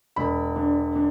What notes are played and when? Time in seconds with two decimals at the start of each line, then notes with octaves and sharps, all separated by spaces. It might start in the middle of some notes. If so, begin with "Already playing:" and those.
0.16 E1 B5
0.56 D3
0.95 D3